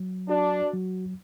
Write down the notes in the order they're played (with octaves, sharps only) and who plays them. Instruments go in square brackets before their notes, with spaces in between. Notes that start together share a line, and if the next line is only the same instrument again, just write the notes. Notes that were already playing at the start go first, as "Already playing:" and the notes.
Already playing: [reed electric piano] F#3
[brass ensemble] D4 [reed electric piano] F#4
[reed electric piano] F#3